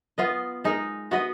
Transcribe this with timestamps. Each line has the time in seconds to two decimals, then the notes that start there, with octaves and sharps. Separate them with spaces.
0.18 B3 F4 B4 D#5
0.64 G#3 D#4 A#4
1.11 B3 F#4 B4 D#5